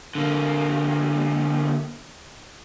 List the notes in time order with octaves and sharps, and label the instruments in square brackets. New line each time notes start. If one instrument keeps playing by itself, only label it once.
[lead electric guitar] D3 A#3